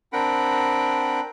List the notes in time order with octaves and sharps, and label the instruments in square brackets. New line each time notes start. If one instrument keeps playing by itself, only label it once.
[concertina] C4 D4 A#4 F#5 G5 B5